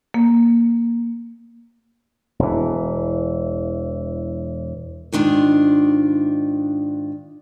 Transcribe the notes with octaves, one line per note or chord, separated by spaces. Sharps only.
A#3
E1 E3
G#2 D#3 D4 F4